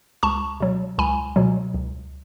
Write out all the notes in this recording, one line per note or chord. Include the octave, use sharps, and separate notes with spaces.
C#2 A5 C#6
B2 F#3
C#2 G#5 B5
B2 F#3
C#2